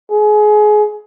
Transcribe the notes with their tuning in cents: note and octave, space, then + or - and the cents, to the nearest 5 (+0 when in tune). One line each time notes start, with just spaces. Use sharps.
G#4 +25